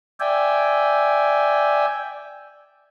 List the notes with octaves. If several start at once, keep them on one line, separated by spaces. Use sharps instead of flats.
D5 E5 G5 G#5